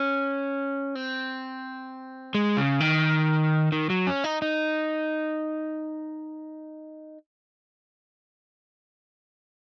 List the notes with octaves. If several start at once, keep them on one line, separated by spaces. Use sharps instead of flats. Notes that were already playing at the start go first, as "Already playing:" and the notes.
Already playing: C#4
C4
G#3
C#3
D#3
D#3
F#3
C#4
D#4
D#4